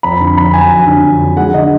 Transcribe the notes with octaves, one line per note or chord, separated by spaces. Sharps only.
F2 B5
D3
F2 B5
F#3 G#5
F2
D3
F2
F#3
G#3 F#5
D3 D#5